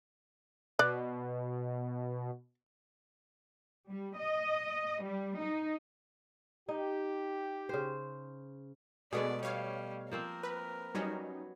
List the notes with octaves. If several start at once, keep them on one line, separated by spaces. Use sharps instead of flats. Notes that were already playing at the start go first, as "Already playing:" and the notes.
B2 D5 F#6
G3
D#5
G3
D#4
D#4 G4
C#3 C5
B2 G#3 A3 B3 G#4 D5
G3 C#5 F5
F3 A#3 C4 A#4
B4
F#3 G3 B3 C#4 D#4